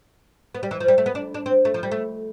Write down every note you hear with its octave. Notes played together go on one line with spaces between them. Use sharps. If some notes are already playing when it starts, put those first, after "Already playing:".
B3
G3
E3
F3
G3
A3
B3
D4
D4
C4
A3
F3
G3
A3